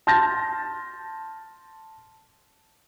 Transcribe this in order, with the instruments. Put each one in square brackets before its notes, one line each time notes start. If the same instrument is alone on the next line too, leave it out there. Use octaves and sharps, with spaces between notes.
[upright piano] A5 C6 F6 G6 A6 A#6